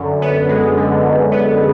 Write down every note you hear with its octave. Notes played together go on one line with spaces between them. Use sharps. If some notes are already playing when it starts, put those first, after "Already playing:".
Already playing: F#2 D3
B3
G#3
D3
F#2
B3